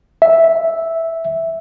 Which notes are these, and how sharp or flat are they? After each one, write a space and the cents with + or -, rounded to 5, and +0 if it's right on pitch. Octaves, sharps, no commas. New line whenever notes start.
E5 -5